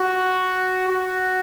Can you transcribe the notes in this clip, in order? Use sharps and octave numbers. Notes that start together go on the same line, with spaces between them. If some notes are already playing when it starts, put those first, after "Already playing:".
Already playing: F#4
F#4